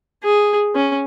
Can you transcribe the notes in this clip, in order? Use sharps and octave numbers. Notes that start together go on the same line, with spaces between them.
G#4
C#4